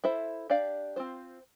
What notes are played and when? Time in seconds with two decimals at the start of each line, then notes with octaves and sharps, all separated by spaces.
0.04 E4 A4 C5 E5
0.50 D4 G4 D5 F5
0.96 C4 F4 C5